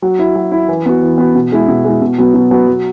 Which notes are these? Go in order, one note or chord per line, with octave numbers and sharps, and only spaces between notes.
F#3
E4
F#3
E4
E3
B3 F#4
E3
B3 F#4
B2
G#3 E4
B2
G#3 E4
B2
F#3 B3
B2
F#3 B3
F#3